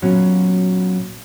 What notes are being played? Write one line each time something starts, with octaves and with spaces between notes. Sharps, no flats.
A#2 F#3 B3 C#4 F4 F#4